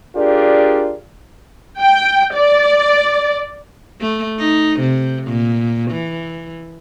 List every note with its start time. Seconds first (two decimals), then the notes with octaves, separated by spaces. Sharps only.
0.16 D4 F4 G4 G#4 A#4 D5
1.80 G5
2.35 D5
4.01 A3
4.39 D#4
4.80 C3
5.27 A#2
5.91 E3